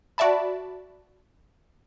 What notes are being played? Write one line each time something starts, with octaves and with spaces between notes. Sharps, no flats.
F#4 D5 E5 A5 B5